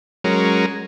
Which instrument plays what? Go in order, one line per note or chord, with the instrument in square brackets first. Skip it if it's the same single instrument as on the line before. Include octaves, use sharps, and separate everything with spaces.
[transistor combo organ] F#3 G#3 C#4 A#4